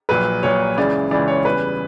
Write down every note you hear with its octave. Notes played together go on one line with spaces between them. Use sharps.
A#1 A#2 F#3 B4
A#1 A#2 F#3 C#5
C#2 C#3 E3 D5
C#2 C#3 E3 D5
C#5
E2 C#3 G3 B4